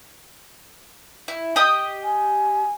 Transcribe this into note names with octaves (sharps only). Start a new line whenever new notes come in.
E4
G4 D#5 D#6
G#5